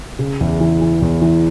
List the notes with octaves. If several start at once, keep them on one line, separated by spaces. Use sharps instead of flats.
C#3
E2
E3
E3
E2
E3